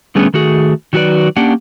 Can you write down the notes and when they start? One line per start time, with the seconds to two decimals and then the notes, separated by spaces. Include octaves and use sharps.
0.15 D3 G3 A3 B3 C#4 G#4
0.34 D#3 A3 F#4 G#4
0.93 D#3 F#3 F#4 G4 B4 D5
1.36 A#3 C#4 D4 G4 F#5